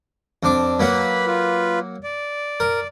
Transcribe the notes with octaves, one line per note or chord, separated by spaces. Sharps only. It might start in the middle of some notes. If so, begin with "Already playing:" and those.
F2 D4 D6
F#3 A#3 F#4 B4 B5
F4 B4
D5
A#4